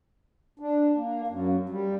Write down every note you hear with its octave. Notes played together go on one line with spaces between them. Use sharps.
D4
A#3
F#2
G3